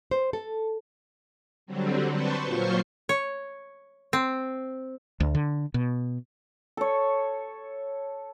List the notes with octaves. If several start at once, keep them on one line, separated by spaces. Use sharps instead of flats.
C5
A4
D3 F#3 G3 C4
B4 C5 A5 C6 C#6
A#2 F#3 F4 C5 C#6 C7
C#5
C4
D2
D3
B2
A4 C#5